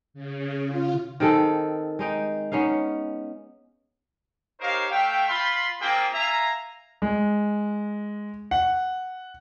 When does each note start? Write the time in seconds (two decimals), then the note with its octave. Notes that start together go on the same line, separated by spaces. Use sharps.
0.14 C#3
0.67 F4
1.20 D#3 C4 G#4 A4
1.99 G#3 D#4 G5
2.52 B3 C#4 D#4 F5
4.61 D#4 G4 A#4 C5 C#5 F5
4.91 A3 E5 F5 G5
5.28 F4 B5 C6
5.81 A#3 C4 E4 F4 G#4 G5
6.13 E5 F5 G#5 A#5
7.02 G#3
8.51 F#5